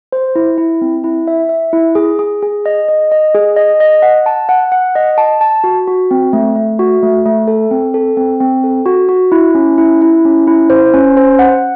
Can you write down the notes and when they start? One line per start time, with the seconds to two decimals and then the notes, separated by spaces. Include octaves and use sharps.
0.12 C5
0.35 E4
0.58 E4
0.81 C4
1.04 E4
1.27 E5
1.49 E5
1.73 E4
1.95 G#4
2.19 G#4
2.43 G#4
2.66 D#5
2.89 D#5
3.12 D#5
3.35 G#4
3.56 D#5
3.80 D#5
4.02 F#5
4.26 A5
4.49 F#5
4.72 F#5
4.95 D#5
5.18 A5
5.41 A5
5.64 F#4
5.88 F#4
6.11 C4
6.33 A3
6.56 A3
6.79 F#4
7.03 A3
7.26 A3
7.48 A4
7.71 C4
7.94 A4
8.17 C4
8.40 C4
8.64 A4
8.86 F#4
9.09 F#4
9.32 E4
9.55 C#4
9.78 E4
10.01 E4
10.25 C#4
10.47 E4
10.70 C5
10.94 C#4
11.17 C5
11.39 F#5